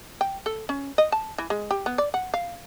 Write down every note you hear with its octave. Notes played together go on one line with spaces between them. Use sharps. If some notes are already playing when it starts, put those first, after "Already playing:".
G5
A4
C#4
D#5
A5
E3
G#3
G4
B3
D5
F#5
F5